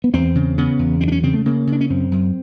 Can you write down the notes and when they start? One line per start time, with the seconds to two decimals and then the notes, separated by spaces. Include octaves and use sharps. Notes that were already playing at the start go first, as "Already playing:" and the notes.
0.04 B3
0.14 E2 C4
0.35 C#3
0.58 C#3 B3
0.79 E2
1.01 F#2 C4
1.08 D4
1.12 C#4
1.23 C#3 C4
1.34 A3
1.46 C#3 A#3
1.67 C#3
1.72 D4
1.81 C#4
1.90 F#2 C4
2.12 F#2